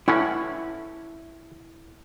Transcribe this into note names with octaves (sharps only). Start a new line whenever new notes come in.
A2 E3 C#4 E4 F#5